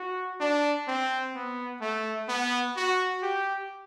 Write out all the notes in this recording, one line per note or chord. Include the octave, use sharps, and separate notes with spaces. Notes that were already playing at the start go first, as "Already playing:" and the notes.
Already playing: F#4
D4
C4
B3
A3
B3
F#4
G4